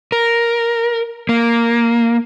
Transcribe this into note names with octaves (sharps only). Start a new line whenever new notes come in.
A#4
A#3